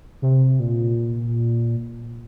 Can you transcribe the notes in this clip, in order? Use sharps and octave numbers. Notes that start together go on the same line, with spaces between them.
C3
A#2